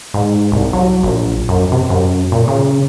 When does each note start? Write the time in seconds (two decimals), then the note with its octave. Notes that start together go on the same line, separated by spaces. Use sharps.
0.14 G#2
0.52 C2
0.73 F#3
1.03 A#1
1.49 F#2
1.72 C3
1.90 F#2
2.32 A#2
2.48 C#3